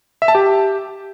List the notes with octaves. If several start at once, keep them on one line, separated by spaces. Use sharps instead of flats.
E5
A5
G4